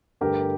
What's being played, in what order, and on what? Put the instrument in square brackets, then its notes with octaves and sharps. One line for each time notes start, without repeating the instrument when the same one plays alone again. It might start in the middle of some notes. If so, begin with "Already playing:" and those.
[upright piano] G2 D3 A3 G4 A#4